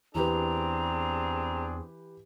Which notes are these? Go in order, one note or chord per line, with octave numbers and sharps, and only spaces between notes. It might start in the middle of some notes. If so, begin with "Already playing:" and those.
E2 E3 C4 D4 G4 G#4 B4 A#5